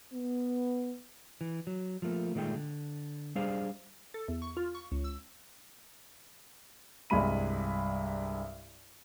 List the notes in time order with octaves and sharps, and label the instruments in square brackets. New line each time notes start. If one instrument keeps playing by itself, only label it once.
[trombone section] B3
[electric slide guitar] E3
F#3
F3 F#3 A3 A#3
A#2 D#3 G#3 A3 G5
D3
G3 D4 G#4 C5 F5
[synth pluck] A4
E2
C#6
F4
C#6
C#2
E6
[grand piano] C2 G2 G#3 B5 D#7